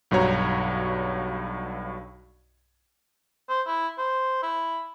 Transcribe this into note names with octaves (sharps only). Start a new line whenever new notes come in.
B1 G2 F#4 C#5 A#5
C5
E4
C5
E4